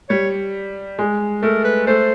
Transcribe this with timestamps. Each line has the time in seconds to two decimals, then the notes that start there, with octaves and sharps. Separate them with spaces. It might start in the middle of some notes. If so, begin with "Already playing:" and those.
0.09 G3 C#5
0.99 G#3
1.43 A3 A#4
1.64 B4
1.87 A3 C5